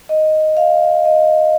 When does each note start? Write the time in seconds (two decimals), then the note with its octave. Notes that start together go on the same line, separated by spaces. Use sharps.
0.09 D#5
0.57 F5
1.05 D#5